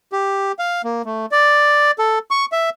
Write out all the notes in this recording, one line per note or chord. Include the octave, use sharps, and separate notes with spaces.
G4
F5
A#3
A3
D5
A4
C#6
E5